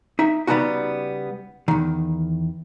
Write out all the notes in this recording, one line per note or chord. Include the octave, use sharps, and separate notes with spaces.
D#4 E5
C#3 G3 B3 D4 D#4 F#4
E2 D#3